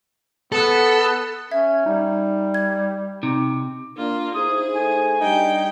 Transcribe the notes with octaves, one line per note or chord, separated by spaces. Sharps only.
B3 A4
C#4 E5 G#6
G3 D#4
G#6
C3 D#4
A#3 D4 F4
D#4 E4 G#4 C5 D#6
A3 G#5
G3 D4 D#4 G4 G5